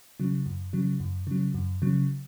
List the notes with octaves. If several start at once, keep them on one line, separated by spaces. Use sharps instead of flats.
C#3 F#3
F#2
C#3 F#3
F#2
C#3 F#3
F#2
C#3 F#3